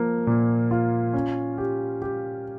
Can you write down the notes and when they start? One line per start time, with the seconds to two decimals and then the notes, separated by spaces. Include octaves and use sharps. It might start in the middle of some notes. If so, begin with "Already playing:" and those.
Already playing: F3 A#3
0.27 A#2
0.71 F4
1.14 C#4
1.58 G4
2.02 G4